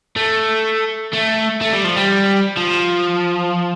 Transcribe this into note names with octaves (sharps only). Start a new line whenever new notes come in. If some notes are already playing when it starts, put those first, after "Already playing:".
A3
A3
A3
G3
F3
G3
F3